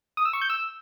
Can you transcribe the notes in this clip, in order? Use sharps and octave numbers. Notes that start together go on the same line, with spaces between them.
D#6
E6
C#6
G6
E6